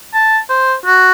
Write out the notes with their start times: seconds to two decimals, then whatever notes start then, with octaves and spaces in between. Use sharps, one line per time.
0.14 A5
0.49 C5
0.85 F#4